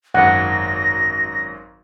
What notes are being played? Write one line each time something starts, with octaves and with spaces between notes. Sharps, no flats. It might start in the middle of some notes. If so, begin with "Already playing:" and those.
G#1 F#2 F#5 A#6